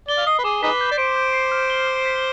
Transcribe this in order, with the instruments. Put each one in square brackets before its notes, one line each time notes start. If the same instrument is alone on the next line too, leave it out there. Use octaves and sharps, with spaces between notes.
[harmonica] D5 [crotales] G7
[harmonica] F5
[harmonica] D#5 [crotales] C7
[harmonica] B4
[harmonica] G#4 [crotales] D6
[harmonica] D#4 G#4 B4 [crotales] B6
[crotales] G6
[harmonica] D5
[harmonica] C5 [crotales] D7
[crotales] G6
C7
F6
G7
F6
B6